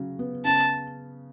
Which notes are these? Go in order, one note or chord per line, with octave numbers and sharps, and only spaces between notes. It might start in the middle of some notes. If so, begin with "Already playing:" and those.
Already playing: C#3 F#3
B3
C#3 A5